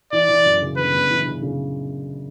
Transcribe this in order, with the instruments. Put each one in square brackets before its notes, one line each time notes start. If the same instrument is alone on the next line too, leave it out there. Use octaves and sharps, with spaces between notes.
[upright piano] E3 [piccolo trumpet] D5
[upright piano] E3
F#2
C#3
[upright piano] G1 [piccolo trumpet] B4
[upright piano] G1
E3
C#3
C#3